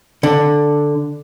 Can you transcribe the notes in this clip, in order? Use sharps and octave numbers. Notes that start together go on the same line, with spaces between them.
D3